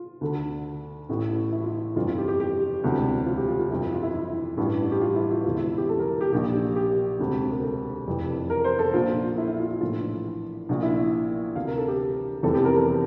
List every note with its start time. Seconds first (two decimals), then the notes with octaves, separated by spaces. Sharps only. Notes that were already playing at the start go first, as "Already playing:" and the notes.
Already playing: F4
0.21 D2 D3
1.09 A1 A2 E3
1.52 E4
1.64 F4
1.96 G1 F2 E3 F4
2.07 F4
2.18 G4
2.28 G4
2.40 G4
2.84 E1 D2 C3 E3
3.26 F4
3.37 G4
3.48 F4
3.59 F4
3.71 G1 F2 E3 E4
3.81 F4
3.93 F4
4.03 E4
4.14 E4
4.57 A1 G2 E3
4.91 G4
5.01 F4
5.16 E4
5.31 F4
5.44 E1 E2 D3 F4
5.56 E4
5.67 F4
5.78 G4
5.89 A4
5.99 A#4
6.21 G4
6.32 A#1 A#2 G4
6.76 G4
7.19 E1 D2 C3
7.51 A#4
7.63 A4
8.07 F1 F2 E3
8.50 A#4
8.64 C5
8.79 A4
8.94 A#1 A#2 F4
9.38 E4
9.48 E4
9.60 F4
9.71 F4
9.81 A#1 A2 E3 F4
10.69 A#1 A#2
10.83 E4
11.55 D2 C3 E3 F5
11.67 A#4
11.78 A4
11.88 G4
12.43 F1 E2 C3 E3 A4
12.54 G4
12.65 A#4
12.76 A4